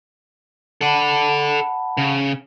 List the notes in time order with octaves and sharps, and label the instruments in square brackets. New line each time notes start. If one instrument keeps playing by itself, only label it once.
[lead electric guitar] A4 D5 [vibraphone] F#5 A5 B5
[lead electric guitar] C#3